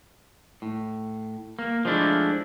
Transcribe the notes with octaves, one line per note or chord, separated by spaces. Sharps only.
A2
A#3
F3 G#3 A3 D4 E4